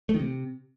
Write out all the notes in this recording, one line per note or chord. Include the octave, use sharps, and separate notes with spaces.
A3
D#3
C3